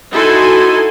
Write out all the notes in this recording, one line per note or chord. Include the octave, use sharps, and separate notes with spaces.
D#4 E4 F#4 A4 G#5 C6